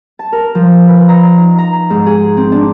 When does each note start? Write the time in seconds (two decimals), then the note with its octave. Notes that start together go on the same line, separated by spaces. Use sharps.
0.19 A5
0.32 A#4
0.55 F3
0.88 B4
1.09 A#5
1.37 D#4
1.58 A#5
1.90 G#2
2.06 G#4
2.37 C4
2.52 D4